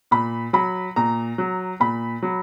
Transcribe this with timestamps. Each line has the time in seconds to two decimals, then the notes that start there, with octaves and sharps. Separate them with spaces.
0.11 A#2 B5
0.53 F#3 B5
0.96 A#2 A#5
1.38 F#3
1.80 A#2 B5
2.23 F#3